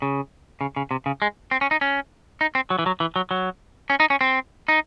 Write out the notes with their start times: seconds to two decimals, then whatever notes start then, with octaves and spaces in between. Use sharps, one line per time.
0.02 C#3
0.61 C#3
0.76 C#3
0.91 C3
1.06 C#3
1.22 G#3
1.51 C4
1.61 C#4
1.71 D#4
1.81 C#4
2.41 D#4
2.55 C4
2.70 F#3
2.79 E3
2.86 F#3
3.00 E3
3.16 F#3
3.31 F#3
3.90 C#4
4.00 D#4
4.10 C#4
4.21 C4
4.68 D#4